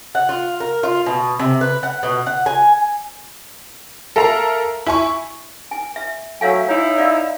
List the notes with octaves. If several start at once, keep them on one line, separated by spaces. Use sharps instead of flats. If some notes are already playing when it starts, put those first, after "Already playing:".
F#5
F4
A#4
F4
B2
C3
B4
F#5
B2
F#5
G#5
A4 A#4 E5 F5 A#5
E4 G#5 C#6
G#5
E5
F#3 A3 C#5 F5 G#5
D#4 E4 C#5
D5 D#5 F5